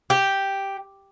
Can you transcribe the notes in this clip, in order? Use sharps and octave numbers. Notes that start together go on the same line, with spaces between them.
G4